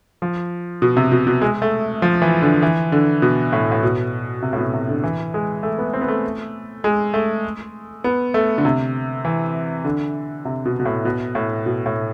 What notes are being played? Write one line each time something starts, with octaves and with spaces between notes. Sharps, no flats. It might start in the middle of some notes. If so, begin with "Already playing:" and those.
F3
B2
C3
B2
B2
G#3
A3
F3
E3
D3
E3
D3
B2
A2
A2
B2
C3
A2
B2
C3
D3
E3
G#3
A3
B3
C4
B3
A3
G#3
A3
B3
A3
D3
C3
E3
D3
C3
B2
B2
A2
B2
A2
B2
A2